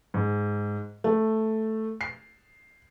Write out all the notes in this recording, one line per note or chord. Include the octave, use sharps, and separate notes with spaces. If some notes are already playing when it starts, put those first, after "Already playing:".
G#2
A3
C7